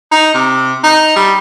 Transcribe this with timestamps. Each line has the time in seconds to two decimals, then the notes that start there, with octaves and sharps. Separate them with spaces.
0.12 D#4
0.34 C3
0.84 D#4
1.16 G3